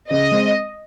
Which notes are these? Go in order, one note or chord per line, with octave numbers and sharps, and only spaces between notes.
C#3 D#5
G#3 C4